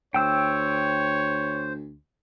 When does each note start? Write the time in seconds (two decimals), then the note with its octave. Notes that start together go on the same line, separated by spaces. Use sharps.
0.14 D2 C5 C#5 G5 E6